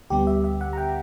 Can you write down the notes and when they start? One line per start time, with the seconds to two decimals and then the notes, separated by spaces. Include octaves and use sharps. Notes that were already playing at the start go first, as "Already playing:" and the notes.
0.10 D2 D3 G3 B3 G4
0.27 E5
0.44 E5
0.61 F#5
0.73 A#5
0.78 G5